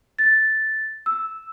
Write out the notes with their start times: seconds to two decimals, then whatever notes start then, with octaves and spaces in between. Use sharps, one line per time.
0.19 A6
1.06 E6